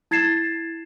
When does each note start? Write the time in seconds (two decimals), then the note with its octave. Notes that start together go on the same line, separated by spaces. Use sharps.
0.11 E4 G#6 A6 C7 E7